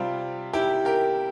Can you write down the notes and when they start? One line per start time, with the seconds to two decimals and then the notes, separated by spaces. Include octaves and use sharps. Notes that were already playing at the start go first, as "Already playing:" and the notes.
Already playing: C3 G3 C4 F4
0.53 E4 G4
0.85 G4 A#4